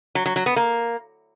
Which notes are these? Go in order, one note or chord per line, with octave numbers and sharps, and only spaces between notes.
F#3
F#3
F#3
B3
A#3